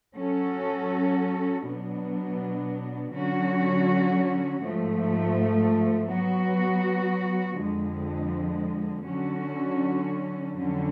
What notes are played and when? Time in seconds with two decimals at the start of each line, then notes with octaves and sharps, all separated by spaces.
0.15 F#3 C#4 F#4 A4
1.64 B2 F#3 B3 D4
3.13 D3 F#3 C#4 F#4 C#5
4.61 G#2 F3 A3
6.09 F#3 B3 F#4
7.58 F2 D3 F3 G#3
9.06 D3 F#3 C#4 F#4
10.53 F2 D3 F#3 C#4